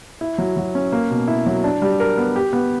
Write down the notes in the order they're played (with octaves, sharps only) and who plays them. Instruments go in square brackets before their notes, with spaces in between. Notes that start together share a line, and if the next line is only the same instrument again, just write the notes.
[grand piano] E4
F#3
F#3
C#4
A#3
B2
E4
F#3
D4
G3
A#4
B3
G4
B3